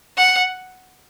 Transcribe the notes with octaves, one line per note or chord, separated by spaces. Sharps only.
F#5